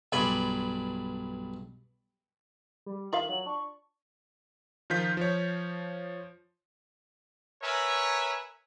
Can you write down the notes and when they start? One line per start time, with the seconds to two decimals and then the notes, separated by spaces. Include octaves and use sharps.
0.12 B1 G2 D5 G#5 B5 C6
2.86 G3
3.13 D#3 F4 E5 F5 F#7
3.29 F#3
3.46 D4 C#6
4.90 D#3 F3 F4 G6 B6
5.17 F3 C#5
7.63 A#4 B4 C#5 E5 G#5 A#5